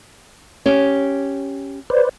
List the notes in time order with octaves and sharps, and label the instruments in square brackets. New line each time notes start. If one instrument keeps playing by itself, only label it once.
[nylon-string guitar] C#4 G4
[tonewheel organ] B4 C5 D5